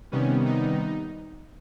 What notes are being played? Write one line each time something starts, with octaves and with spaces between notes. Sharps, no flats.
C3 D#3 G3 B3 C#4
D#4